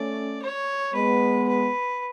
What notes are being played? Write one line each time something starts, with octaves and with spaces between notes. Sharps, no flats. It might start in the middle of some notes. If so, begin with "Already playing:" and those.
Already playing: A3 C#4 D5
C#5
G#3 B3 B4
B4